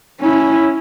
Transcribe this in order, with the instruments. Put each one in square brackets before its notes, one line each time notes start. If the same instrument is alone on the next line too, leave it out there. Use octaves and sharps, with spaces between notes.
[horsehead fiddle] C#4 E4